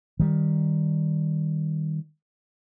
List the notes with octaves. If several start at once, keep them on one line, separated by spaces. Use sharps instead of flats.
D#3 G3